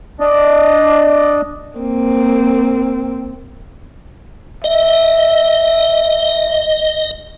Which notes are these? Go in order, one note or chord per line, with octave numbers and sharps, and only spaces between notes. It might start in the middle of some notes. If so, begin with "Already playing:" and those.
D4 D5 D#5
A#3 C4
D#5 E5